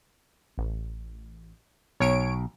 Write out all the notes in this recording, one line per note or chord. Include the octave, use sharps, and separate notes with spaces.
A1
B1 C#5 D7